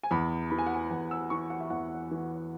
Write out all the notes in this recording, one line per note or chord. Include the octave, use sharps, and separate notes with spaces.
G#5
E2 B5
E3 B5
G#5
F#5
G#5
E2
E6
E3 C#6
F#5
E5
E2 F#5
E3